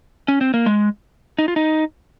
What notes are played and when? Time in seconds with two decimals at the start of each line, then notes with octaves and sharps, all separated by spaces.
0.28 C#4
0.41 C4
0.54 A#3
0.66 G#3
1.39 D#4
1.48 F4
1.56 D#4